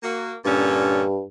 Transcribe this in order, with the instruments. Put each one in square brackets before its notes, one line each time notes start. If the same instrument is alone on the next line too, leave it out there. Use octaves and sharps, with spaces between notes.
[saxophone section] A#3 F#4
[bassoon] G2 [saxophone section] A#2 D3 C#4